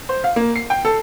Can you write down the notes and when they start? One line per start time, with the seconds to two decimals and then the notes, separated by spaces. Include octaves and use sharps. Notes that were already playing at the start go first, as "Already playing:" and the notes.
0.09 C5
0.24 F5
0.36 A#3
0.56 C7
0.70 G5
0.85 A4